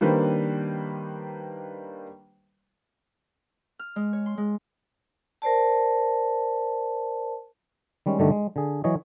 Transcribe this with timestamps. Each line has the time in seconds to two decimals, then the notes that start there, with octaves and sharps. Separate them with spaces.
0.01 D#3 G3 A#3 D4 B4 C5
3.79 F6
3.96 G#3
4.13 C#5
4.26 C6
4.38 G#3
5.42 A#4 C5 D5 A5
8.06 D#3 G3 G#3 C#4
8.19 G2 D3 D#3 G3 A3 D4
8.31 G#3
8.56 D3 G#4
8.84 E3 F#3 C#5 D#5